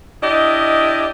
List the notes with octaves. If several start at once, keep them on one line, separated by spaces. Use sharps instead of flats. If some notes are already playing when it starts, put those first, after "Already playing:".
D4 E4 G4 D#5